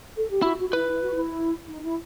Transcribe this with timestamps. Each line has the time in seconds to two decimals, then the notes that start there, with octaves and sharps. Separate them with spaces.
0.17 A4
0.30 G4
0.42 E4 F#4
0.58 F#4
0.69 F#4
0.73 E4 B4
0.89 E4
1.02 F#4
1.14 E4
1.68 D#4
1.83 E4